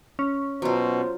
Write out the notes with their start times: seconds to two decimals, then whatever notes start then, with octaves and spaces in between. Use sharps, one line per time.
0.19 C#4
0.62 B2 F#3 F4 C5